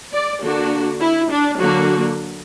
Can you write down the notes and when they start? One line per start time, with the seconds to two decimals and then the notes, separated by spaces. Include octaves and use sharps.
0.12 D5
0.42 D3 A#3 D4 F#4
1.00 E4
1.31 D4
1.60 D3 F#3 A#3 F#4